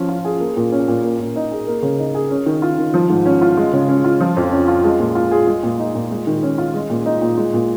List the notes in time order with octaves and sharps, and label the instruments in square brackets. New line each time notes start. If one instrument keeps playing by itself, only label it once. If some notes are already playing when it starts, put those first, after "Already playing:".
Already playing: [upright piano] F3 C#4
F4
G#4
A#3
A#2
C#4
A#2
A#3
A#2
D#4
G#4
A#3
C#3
D#4
G#4
C#4
D#3
F4
D#3
F3
G#2
C#4
F4
G#3
C#3
C#4
F4
F3
F2
C#4
F4
G#3
A#2
F4
G#4
G#3
A#2
D#4
A#2
G#3
D#3
C#4
F4
G#3
A#2
D#4
A#2
G#3
A#2